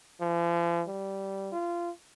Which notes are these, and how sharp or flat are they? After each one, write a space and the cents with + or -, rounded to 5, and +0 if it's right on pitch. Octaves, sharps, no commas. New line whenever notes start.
F3 -45
G3 -10
F4 -20